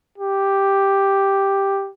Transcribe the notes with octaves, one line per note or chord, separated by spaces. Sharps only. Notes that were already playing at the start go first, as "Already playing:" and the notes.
G4